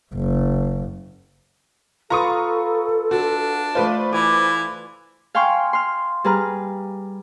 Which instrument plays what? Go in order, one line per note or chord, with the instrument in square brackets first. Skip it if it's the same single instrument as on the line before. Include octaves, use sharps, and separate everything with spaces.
[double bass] F#1
[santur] F4 B4 C6 [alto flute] A4 [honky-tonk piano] A#5 C#6 D#6
[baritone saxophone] D4 [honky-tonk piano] F#4
[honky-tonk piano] A3 B4 C5 [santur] F4 D5 [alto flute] B5
[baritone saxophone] E3 [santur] G#5 D6
[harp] F5 G5 G#5 C6 C#6 F6
C6 F6
G3 G#4 B4 A#5 F6